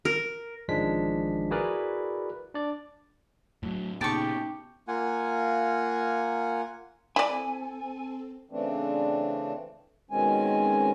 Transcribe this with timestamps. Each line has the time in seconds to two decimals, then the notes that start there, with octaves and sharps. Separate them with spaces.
0.05 A#4
0.68 A1 D#3 F3 G#3 D4 B6
1.51 E4 F#4 G#4 A#4 B4 D5
2.54 D4 D5
3.63 A2 F#3
4.01 A#2 C#3 B3 D#4 G4 A5 C#6
4.88 A#3 F4 F#5 G#5
7.16 C4 E4 A4 D5 G#5
8.51 C#3 E3 A3 C4 D4
10.11 B2 D#3 G#3 C4 C#4 G#5